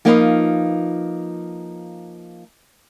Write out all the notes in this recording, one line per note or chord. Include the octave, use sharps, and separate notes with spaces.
F3 A#3 D#4 F4 B4 F5